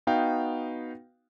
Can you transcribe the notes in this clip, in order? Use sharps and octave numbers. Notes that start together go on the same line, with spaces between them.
B3 D#4 F#4 F5 G5